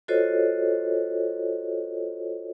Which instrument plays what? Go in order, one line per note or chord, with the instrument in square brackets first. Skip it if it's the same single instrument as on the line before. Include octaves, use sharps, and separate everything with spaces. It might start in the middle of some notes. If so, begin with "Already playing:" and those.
[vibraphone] F4 F#4 A4 C5 C#5 D#5